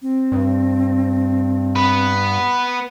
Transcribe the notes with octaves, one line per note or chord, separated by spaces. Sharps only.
C4
G2
B3 B4